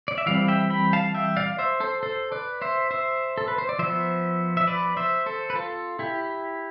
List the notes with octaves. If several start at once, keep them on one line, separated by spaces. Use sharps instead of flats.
D5
E5
E3 G3 C4 D5 F5
E5 G5
G5 B5
F5 A5
E5 G5
D5 F5
C5 E5
A4 C5
A4 C5
B4 D5
C5 E5
C5 E5
A4
B4
C5
D5
F3 B3 C5 E5
E5
B4 D5
C5 E5
A4 C5
B4
F4 A4
E4 G4